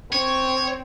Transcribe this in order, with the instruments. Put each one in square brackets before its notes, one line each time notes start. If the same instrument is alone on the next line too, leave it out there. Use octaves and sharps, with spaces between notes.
[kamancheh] C4 [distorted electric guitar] C#5